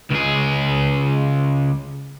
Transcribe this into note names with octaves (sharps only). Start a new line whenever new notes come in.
C#2 G#4